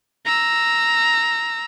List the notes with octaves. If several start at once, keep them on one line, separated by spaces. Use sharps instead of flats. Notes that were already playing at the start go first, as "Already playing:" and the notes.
A#5 E6